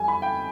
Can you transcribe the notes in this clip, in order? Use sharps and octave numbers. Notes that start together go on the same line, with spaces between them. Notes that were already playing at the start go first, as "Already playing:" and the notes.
Already playing: F2 G3 G#5
B5
G5